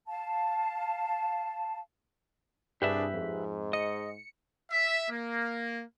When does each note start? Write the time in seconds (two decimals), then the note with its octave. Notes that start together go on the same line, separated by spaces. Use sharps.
0.07 F5 A5
2.82 C2 G2 D4 G4 G#4 B4 E5
3.14 F2 G#2
3.73 D#5 C#7
4.71 E5
5.10 A#3